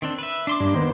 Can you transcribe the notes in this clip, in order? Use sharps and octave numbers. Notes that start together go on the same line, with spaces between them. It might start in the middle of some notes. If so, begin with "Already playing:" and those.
D#3 C4 D4
B4 E5
D4 C6 D6
G2 G#3 A#3 D4
D#3 B3 C5